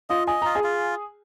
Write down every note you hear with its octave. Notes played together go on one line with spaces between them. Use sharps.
F4 D#5 F5
D#5 G#5
F4 A#5
G#4 G#5
F4